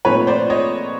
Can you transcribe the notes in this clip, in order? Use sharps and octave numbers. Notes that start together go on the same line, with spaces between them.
A#2 F3 A3 C4 D#4 B4 C#5
C5 D5
C#5 D#5